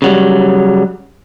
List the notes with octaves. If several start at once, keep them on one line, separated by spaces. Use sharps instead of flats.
C#3 F#3 G3